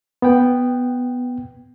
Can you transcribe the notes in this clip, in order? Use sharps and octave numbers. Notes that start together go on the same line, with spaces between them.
B3 G5